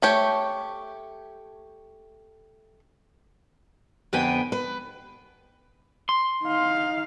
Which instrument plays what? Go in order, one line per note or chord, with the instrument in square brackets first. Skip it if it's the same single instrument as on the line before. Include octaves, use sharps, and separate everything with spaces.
[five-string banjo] A3 G4 C#5
[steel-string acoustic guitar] F2 D3 B3 B4 G5 G#5
B4
[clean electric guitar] C6
[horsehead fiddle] D#4 F5